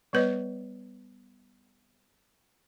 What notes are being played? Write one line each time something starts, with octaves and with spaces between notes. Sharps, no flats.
G3 B3 B4 C#5 D#5